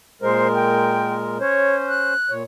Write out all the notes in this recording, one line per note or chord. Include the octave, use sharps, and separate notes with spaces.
A#2 G#3 A#4 C5
G5
C#4 C5 C#5
F#6
A#2 C#5